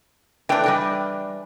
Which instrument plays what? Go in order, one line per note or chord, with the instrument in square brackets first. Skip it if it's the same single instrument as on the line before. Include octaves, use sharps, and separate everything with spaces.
[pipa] E3 D4 [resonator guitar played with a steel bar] A3 G5
[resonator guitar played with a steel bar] G3 D#5 G5